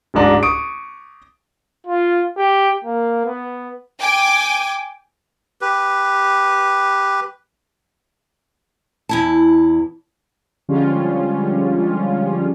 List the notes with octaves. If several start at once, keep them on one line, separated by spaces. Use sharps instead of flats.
D1 A1 G#2 D4 A#5
C#6 D#6 D7
F4
G4
A#3
B3
G5 G#5 D6
G4 B4
E2 E4 A5
D3 F3 G3 G#3 C#4 F4